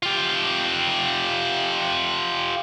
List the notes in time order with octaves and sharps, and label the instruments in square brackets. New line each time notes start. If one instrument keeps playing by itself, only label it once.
[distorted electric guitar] F4 G4